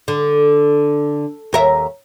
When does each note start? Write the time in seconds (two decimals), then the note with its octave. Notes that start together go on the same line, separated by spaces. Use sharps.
0.08 D3
1.53 D#2 A#4 E5